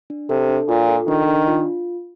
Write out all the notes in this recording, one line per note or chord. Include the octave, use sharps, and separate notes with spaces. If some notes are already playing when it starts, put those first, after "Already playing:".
D4
C3 A4
D4
A#2 F4
A4
D#3 D4
D4
F4